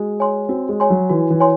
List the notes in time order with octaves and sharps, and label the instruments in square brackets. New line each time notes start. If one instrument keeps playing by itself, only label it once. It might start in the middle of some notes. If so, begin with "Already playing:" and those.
Already playing: [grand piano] G#3 [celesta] F#4
[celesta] C#5 G#5 C6
[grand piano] C4 [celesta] F#4
[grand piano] G#3
[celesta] C#5 G#5 C6
[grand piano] F#3
[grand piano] E3 [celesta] F#4
[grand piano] E3
[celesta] C#5 G#5 C6